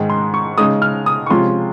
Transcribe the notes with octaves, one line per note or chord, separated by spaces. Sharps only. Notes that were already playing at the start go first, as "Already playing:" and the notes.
Already playing: G#2 D#3 G#3 D#4
C6
C#6
C#3 G#3 D#4 D#6
F6
D#6
C#6
C3 F3 G#3 C#4 F4 C6